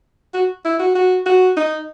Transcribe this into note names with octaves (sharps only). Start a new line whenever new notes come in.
F#4
E4
F#4
F#4
F#4
D#4